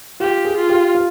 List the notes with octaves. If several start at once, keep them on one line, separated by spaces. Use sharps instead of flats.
F4 G4
G#4
F4
G4
F4